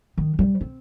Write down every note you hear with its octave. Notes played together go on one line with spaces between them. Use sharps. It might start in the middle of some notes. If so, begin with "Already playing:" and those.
D#3
G3
C4